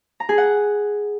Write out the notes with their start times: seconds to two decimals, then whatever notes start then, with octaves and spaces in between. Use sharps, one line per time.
0.20 A#5
0.29 G#4
0.38 F#5